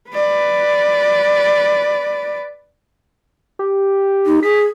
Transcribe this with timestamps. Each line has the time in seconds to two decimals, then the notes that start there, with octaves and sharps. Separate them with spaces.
0.10 B4 D5
3.59 G4
4.26 D#4
4.43 G#4 B6